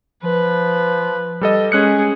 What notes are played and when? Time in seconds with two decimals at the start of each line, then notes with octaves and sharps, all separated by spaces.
0.24 F3 B4
1.41 G3 A4 D#5
1.72 G#3 C#4 G#4 F#6 C#7